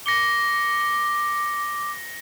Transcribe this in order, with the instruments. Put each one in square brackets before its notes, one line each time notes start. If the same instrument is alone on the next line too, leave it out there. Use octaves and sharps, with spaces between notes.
[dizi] D6 [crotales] A#6 C#7 G7